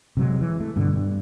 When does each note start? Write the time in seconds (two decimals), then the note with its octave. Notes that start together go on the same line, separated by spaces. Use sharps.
0.17 C3 F#3 G#3
0.41 E3
0.60 A3
0.76 G2 B2 D3
0.95 G2